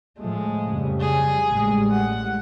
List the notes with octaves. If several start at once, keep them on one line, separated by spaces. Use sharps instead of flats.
A2 F3 G#3 A3
F2 C#3 G3
G#4
A1 G3 G#3
F#5